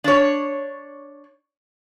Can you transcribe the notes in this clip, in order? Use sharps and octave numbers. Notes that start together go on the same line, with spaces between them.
D4 C#5